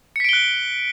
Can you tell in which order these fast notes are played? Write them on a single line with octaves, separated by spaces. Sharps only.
C#7 B6 D7 G7 F#6